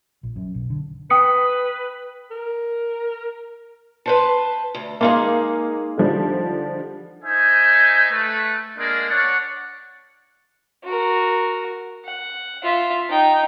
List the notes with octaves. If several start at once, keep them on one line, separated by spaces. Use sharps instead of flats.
A#1
F#2
B1
D3
B4 G5 D#6 C#7
A#4
B4 C5 A5
D2
G#3 A#3 D#4 G#4 F5
D3 F3 G3
D#4 C5 E5 G#5
A3 B4
G#3 A#3 D4 A#4 D5 F5
D4 C#5 D5 F#5
F#4 A#4
F#5
F4 E5
D#4 G5